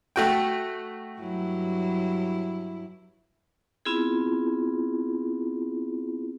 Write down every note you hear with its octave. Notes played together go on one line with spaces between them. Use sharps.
A3 F#4 G5
G2 F#3 E4
B3 C4 E4 F4 G#4